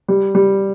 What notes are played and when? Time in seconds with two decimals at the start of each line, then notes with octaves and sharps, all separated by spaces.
0.09 G3
0.35 G3